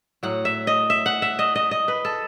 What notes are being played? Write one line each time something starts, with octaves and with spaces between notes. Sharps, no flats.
A2 F#3 F#5
E5
D#5
E5
F#5
E5
D#5
D#5
D#5
B4
A4